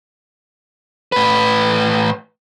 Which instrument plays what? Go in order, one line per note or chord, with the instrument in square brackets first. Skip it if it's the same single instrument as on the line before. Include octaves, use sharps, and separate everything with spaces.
[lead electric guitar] A2 B4